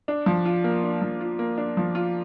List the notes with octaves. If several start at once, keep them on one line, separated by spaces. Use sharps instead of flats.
D4
F3
F4
A#3
D4
F3
F4
A#3
D4
F3
F4